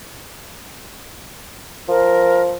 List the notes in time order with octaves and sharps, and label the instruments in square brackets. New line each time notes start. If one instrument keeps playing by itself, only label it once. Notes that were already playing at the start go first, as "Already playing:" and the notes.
[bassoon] F3 [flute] A#4